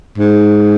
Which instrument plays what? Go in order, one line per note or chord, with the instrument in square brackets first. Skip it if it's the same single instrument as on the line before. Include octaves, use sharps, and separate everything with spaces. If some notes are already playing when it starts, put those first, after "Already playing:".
[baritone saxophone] G#2